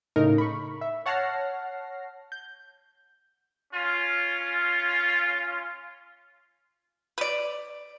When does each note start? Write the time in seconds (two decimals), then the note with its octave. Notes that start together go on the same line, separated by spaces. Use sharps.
0.16 A2 C#3 D#4 A#4
0.38 B5 C#6
0.81 E5
1.06 C#5 F#5 A5 F6 A#6 C7
2.32 G6
3.73 C#4 F4
7.18 B4 D5